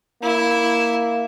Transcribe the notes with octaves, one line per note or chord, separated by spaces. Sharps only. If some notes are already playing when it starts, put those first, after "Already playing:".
A#3 E4 E5